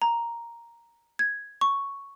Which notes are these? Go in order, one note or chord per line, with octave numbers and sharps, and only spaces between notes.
A#5
G#6
C#6